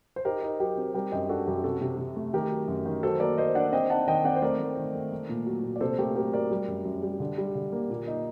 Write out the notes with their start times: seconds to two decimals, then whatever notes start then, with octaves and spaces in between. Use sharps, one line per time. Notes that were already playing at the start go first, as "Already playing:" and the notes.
0.16 C5
0.25 D#4 G4 A#4
0.42 D#4
0.60 F#3 G4 A#4
0.77 C4
0.94 G3 G4 A#4
1.12 F#2 D#5 G5
1.29 D4 F#4 A4
1.47 F#2 G4
1.64 C3 F#4 A4
1.81 C3
1.98 C3
2.16 A3
2.33 D#3 G4 A#4
2.51 F#3
2.68 F#2
2.85 D#3
3.03 F#3 A4 C5
3.20 A#3 A#4 D5
3.38 A#3 C5 D#5
3.55 D4 D5 F#5
3.73 C4 D#5 G5
3.90 D#4 F#5 A5
4.07 D#3 D#5 G5
4.24 C4 D5 F#5
4.36 C5
4.42 A3 A#4 D5
4.60 A3
4.77 D#3
4.94 A3
5.12 A3
5.29 A#2
5.46 F#3
5.64 A#2
5.76 D5
5.81 C3 A4 C5
5.98 A3 G4 A#4
6.16 F#3 G4 A#4
6.33 F#3 A#4 D5
6.51 G3
6.68 F#2
6.85 F#2
7.03 G3
7.20 D3
7.38 G3
7.55 D3
7.72 A#3
7.90 A#2
8.08 D#4